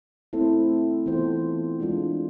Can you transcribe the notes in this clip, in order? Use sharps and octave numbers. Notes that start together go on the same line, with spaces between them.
A3 C4 E4 A4 C5
E3 B3 F4 A4 C5
E3 G#3 D4 F4